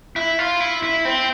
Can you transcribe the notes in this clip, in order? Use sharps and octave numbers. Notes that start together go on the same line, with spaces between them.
E4
F4
E4
E4
C4